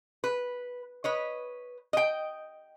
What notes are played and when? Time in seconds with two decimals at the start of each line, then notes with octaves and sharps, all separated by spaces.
0.24 B4
1.04 B4 C#5 D#5
1.93 D#5 G5